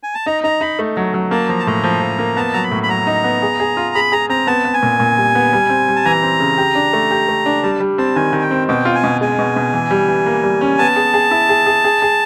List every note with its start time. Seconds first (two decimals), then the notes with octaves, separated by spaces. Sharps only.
0.03 G#5
0.15 A5
0.26 D#4 A#5
0.44 D#4 A#5
0.61 D#4 B5
0.79 A3
0.97 F#3
1.14 F#3
1.31 A#3 A5
1.49 F3 A#5
1.59 A5
1.67 A2 A#5
1.84 F3
2.01 F3
2.19 A#3
2.37 B3 A5
2.53 F#3 A#5
2.63 B5
2.71 A2
2.83 B5
2.89 F#3 A#5
3.07 D#4
3.24 B3
3.42 G#4
3.60 G#4
3.77 F4
3.95 G#4 B5
4.12 G#4 A#5
4.29 C4 A#5
4.47 B3 A5
4.65 B3
4.74 G#5
4.83 A#2
5.00 A#2
5.17 G3
5.35 B3
5.53 G3
5.70 C4
5.88 G3
5.96 A5
6.05 E3 A#5
6.23 C4
6.40 C#3
6.58 G4
6.75 D4
6.93 A3
7.11 G4
7.28 A3
7.46 D4
7.63 G3 A5
7.80 G3
7.98 C4 A5
8.15 D#3 G#5
8.33 D#3
8.42 G5
8.51 C4
8.68 B2 G5
8.85 F4
8.95 G#5
9.04 B2
9.21 G#3 G#5
9.39 B2
9.56 B2
9.73 E3
9.91 G3
10.08 E3
10.26 A#3
10.44 G3
10.61 C#4
10.79 B3 A5
10.96 G#4
11.14 G#4
11.31 E4
11.49 G#4
11.66 G#4
11.84 G#4
12.02 G#4